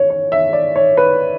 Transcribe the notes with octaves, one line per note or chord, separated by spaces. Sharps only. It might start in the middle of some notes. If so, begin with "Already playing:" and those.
Already playing: C#4 C#5
C#5
E5
D5
C#5
B4